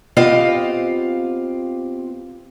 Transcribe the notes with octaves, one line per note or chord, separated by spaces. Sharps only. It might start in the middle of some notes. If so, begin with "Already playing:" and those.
B3 C4 F4 G4 D#5 F5